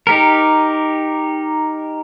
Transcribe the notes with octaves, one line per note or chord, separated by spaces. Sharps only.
D#4 G4 A#4